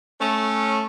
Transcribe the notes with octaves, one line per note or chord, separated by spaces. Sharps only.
A3 C#4